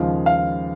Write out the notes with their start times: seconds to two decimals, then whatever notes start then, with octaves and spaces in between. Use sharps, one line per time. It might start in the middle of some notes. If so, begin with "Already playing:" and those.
Already playing: D#2 C#3 F3 G#3 F5
0.26 F5